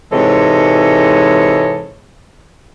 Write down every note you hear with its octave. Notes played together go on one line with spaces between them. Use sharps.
G#2 C3 E3 G#3 A4 C#5